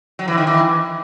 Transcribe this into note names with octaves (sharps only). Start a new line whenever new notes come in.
F#3
E3
D#3
E3